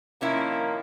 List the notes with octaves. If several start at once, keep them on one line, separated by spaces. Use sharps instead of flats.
C3 D#3 F3 A#3 C#4 E4